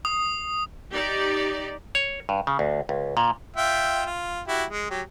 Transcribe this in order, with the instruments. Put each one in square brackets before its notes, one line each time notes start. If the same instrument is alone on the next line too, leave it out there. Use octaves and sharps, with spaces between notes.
[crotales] D#6
[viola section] D#4 G4 D5
[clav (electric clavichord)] C#5
G2
C#3
D2
C#2
A#2
[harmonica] F4 E5 G5
F4
E4 F#4 G4
G#3
F#3 G4